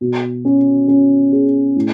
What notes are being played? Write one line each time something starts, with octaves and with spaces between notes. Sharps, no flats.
B2
C#4
C#4
G#4
A2